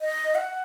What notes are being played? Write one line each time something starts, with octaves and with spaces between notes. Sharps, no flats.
D#5
F#5